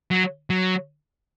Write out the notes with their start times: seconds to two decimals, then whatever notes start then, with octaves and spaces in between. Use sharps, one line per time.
0.11 F#3
0.50 F#3